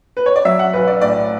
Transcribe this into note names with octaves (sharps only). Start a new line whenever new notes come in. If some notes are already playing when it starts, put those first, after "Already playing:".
B4
C#5
D5
F#3 E5
F#5
B1 B4
D5
A2 D5